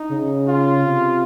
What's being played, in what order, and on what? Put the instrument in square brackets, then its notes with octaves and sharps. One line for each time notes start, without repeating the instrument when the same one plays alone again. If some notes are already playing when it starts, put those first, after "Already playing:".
Already playing: [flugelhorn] D#4
[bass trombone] C#3
[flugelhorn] F4
[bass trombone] C3